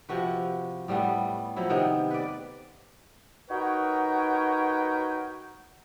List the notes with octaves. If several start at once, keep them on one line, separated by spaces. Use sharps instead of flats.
C3 F3 F#4 B4
A2 G3 A3 B3
F3 F#3 E4
C3 D#3 B3
B4 D5
D#4 F#4 A#4 B4 C#5 G5